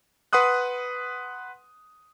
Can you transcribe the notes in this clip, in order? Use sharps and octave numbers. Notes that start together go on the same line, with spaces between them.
B4 F#5 C6 D#6 F#6